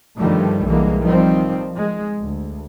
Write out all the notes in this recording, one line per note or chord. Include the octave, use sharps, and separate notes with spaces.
G2 D3 D#3 F3 G3 A3
B1 D3 E3 G3 G#3 A#3
D#3 F3 G3 C4
G#3
D2